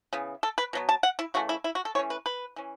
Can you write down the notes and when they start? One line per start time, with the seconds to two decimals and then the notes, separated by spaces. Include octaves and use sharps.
0.13 C#3 E3 B3
0.43 A4
0.58 B4
0.73 B2 F#3 B3
0.89 A5
1.03 F#5
1.19 E4
1.34 C#3 E3 A3 F#4
1.49 E4
1.64 E4
1.75 F#4
1.85 A4
1.95 E3 A3 C#4 C#5
2.10 B4
2.26 B4
2.56 E3 C#4